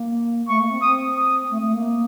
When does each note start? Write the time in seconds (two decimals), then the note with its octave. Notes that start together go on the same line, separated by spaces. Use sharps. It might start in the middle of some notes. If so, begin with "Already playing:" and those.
Already playing: A#3
0.48 A3 C#6
0.60 A#3
0.71 C4
0.82 C4 D#6
1.16 D#6
1.51 A3
1.62 A3
1.74 A#3